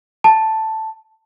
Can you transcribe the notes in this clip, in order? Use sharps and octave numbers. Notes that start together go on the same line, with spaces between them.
A5